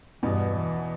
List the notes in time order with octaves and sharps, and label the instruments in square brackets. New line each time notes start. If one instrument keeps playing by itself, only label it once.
[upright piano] E2 B2 B3 [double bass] G2
[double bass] E3